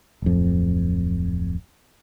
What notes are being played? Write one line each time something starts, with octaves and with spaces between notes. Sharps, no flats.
D1 F2